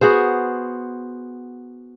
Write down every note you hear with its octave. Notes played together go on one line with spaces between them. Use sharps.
B3 F#4 G#4 C5